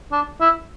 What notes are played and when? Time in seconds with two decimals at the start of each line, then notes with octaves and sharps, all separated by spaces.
0.12 D4
0.41 E4